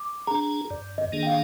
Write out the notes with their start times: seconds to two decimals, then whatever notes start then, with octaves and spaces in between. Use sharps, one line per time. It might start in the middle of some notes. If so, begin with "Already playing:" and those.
Already playing: D6
0.27 D4 G#4 A#5
0.70 G2 D5
0.98 D#5
1.12 D#3 A#3 D4 G#4
1.23 G5
1.26 F5